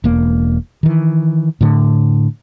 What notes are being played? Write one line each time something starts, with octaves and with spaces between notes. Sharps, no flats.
E1 A#3
D#3 E3
A2 D3